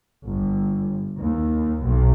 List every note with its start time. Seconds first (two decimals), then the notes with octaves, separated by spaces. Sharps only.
0.23 G1
1.19 D#2
1.82 B1